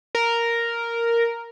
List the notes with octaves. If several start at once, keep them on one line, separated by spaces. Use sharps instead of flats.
A#4